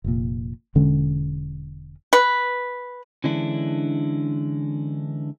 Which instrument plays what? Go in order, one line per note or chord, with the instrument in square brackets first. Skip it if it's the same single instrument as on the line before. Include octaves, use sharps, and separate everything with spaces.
[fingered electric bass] F1 A#2
E1 D3 G#3 C#4
[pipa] B4
[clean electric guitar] D3 E3 G#3 C#4 D4 E4